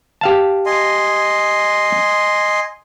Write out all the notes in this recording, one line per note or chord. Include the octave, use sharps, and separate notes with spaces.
G4 F5 A5
D#5 G#5 C6